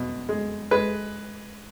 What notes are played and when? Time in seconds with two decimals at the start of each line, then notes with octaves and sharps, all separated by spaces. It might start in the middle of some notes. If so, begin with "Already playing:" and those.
Already playing: B2
0.29 G#3
0.71 G#3 B4